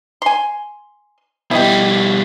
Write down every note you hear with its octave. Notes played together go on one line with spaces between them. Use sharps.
G#5 C6
B2 G3 E4 D#5 G5